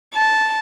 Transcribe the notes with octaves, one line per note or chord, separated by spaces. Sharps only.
A5